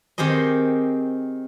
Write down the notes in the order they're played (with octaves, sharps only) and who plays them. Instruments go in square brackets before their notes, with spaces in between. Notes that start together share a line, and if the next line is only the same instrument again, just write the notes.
[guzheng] D#3 C4 G4 G#4 D#5